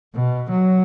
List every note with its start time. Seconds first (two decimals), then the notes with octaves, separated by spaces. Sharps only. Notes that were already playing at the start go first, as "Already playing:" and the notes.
0.15 B2
0.51 F#3